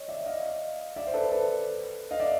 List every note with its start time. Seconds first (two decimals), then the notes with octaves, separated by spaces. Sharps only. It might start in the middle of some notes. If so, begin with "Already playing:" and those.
Already playing: C#5 D#5
0.08 D5 E5
0.26 D#5 F5
0.96 D5 E5
1.07 C5
1.14 A4 B4
1.32 A4 B4
2.11 D#5 F5
2.20 D5 E5